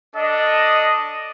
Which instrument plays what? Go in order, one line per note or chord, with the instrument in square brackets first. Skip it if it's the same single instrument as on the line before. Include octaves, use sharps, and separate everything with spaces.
[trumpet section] D4 A4 D#5